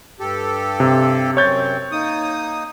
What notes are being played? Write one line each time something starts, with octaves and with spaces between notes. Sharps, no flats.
G2 G4 A4
C3
F#2 C3 C4 C#5 G6 A6
A#3 D#4 D#6